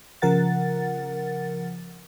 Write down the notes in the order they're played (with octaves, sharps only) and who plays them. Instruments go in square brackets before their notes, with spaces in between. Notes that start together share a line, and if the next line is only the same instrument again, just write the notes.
[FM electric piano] C#3 F3 A#4 F#5 A6